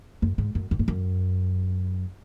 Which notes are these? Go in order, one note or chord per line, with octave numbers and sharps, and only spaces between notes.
F#2
G#2
F#2
F#2
G#2
F#2